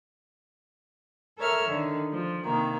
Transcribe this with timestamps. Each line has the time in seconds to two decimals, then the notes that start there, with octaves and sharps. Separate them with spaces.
1.37 A4 A#4 C#5 E5 E6 F6
1.66 D3 D#3
2.11 F3
2.44 C3 D#3 A#3